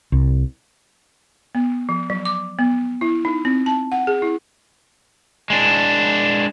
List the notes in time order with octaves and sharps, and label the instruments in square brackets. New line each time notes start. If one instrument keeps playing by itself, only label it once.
[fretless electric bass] C2
[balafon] B3
F3
F#3
D6
B3
E4
D#4
C4
A5
F#5
G#4
E4
[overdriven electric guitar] G#3 D4